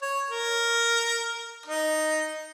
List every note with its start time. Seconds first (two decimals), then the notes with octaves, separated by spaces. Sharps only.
0.02 C#5
0.30 A#4
1.66 D#4